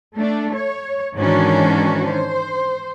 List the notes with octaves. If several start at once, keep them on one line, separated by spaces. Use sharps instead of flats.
A3 D4
C#5
G#2 D#3 E3 C#4 D4 F#4
C5